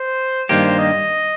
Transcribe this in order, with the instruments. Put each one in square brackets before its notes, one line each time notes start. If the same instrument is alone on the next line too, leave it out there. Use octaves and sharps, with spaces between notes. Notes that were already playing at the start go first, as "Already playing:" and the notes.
Already playing: [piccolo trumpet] C5
[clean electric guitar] G2 D#3 A#3 G4 [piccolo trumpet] C5
[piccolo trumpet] D#5